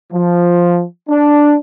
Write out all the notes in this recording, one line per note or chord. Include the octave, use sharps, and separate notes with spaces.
F3
D4